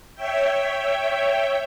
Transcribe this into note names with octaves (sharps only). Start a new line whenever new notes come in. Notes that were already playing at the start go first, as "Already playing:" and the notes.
C#5 E5 G5